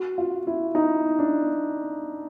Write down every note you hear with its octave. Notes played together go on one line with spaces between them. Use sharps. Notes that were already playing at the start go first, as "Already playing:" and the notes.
Already playing: F#4
F4
E4
D#4
D4